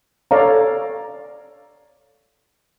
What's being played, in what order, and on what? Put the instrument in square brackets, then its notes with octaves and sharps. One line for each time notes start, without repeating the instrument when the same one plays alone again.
[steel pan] A4 C#5 D5 F5 A#5